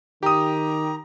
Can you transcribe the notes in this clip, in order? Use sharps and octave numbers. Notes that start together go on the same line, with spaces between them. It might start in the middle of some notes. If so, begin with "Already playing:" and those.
D#3 G4 A#5 D#6